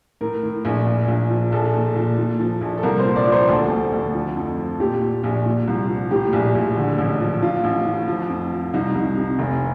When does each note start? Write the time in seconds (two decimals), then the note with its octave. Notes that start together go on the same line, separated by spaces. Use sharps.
0.21 A2 A#4
0.43 A2
0.65 A#1
0.86 A#1
1.08 A#1
1.30 F3
1.52 A#1 A4
1.74 A#2
1.96 A#2
2.18 A#2
2.40 F3
2.61 A#1
2.78 A4
2.83 C2 A#4
3.00 C5
3.05 A#2
3.16 D5
3.27 F3
3.32 C5
3.48 D2 A4
3.71 D2
3.93 D2
4.14 F3
4.36 F2
4.58 F3
4.80 A#2 G4
5.02 A#2
5.24 A#1
5.46 A#2
5.68 C2
5.89 F3
6.11 A2 G4
6.33 A#1
6.55 A#1
6.77 D3
6.98 A1
7.20 F3
7.42 F3 F4
7.64 A1
7.86 A2
8.08 F3
8.30 F2
8.52 F3
8.74 C2 D#4
8.95 C2
9.17 C3
9.39 F1